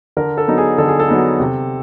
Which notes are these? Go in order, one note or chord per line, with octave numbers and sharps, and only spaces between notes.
D3 A#4
A4
F#3 B3 D#4
G#4
D3 A4
G#4
A4
F#3 B3 D#4
C3